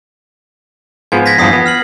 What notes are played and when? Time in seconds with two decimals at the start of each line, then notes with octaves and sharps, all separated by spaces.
1.12 G#2 F3 B3 G#6
1.26 G#6 A#6 B6
1.38 E2 G2 F3 D#6 B6 C7
1.53 B3
1.66 F6 C7 F#7